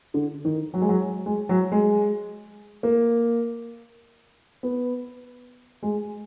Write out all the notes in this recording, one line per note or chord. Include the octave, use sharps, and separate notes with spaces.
D3
D#3
F#3
G#3
F#3
G#3
F#3
G#3
A#3
B3
G#3